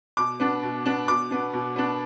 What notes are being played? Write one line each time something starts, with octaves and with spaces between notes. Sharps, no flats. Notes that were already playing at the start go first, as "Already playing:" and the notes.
B2 D6
B3 D4
B2
B3 D4
B2 D6
B3 D4
B2
B3 D4